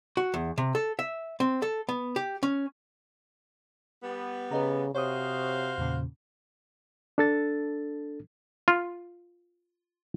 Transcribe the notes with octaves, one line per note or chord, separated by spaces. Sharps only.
F#4
E2
C3
A4
E5
C4
A4
B3
G4
C#4
G3 B3
C#3 B4 D#5 A#5
C3 F#4 C5 C#5 F5 C#6 D#6
E2 A#2 C#3
D4 A4 A6
F4